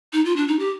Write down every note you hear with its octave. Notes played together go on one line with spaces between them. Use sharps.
D#4
F4
D4
D#4
G4